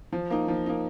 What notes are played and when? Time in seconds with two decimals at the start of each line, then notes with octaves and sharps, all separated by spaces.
0.12 F3
0.30 A#3 D#4
0.48 F3
0.66 A#3 D#4